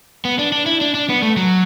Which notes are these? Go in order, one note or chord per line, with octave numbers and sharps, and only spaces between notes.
B3
D4
D4
E4
D4
D4
B3
A3
F#3